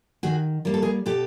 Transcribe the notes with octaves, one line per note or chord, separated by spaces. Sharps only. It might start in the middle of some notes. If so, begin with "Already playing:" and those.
D#3 F#4 G#4
G3 A#3 A#4
A4
G#4 A#4
B2 G4 A4